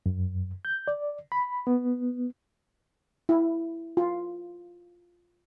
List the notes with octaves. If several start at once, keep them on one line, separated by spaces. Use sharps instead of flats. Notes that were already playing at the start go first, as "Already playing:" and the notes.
F#2
G6
D5
B5
B3
E4
F4